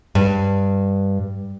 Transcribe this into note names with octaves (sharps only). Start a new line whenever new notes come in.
G2